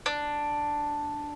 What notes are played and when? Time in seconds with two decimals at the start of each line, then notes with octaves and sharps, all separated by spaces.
0.06 D4